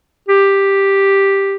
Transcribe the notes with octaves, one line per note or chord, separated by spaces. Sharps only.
G4